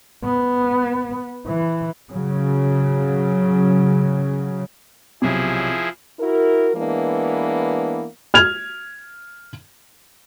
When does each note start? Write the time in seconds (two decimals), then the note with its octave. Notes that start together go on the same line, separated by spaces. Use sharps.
0.24 B3
1.47 E3
2.12 C#3 F#3
5.22 B1 C3 F3 E4 G#4
6.20 E4 F#4 A#4
6.76 E3 G#3 A#3 B3 D4
8.34 F6 G#6 F7